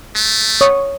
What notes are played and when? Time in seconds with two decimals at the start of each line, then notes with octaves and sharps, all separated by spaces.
0.16 A3
0.61 C#5 C#6 D#6